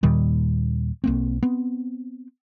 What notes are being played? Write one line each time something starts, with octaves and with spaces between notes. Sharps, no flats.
D#2 A#2 D#3 G3
B1 A#3 C4
B3 C4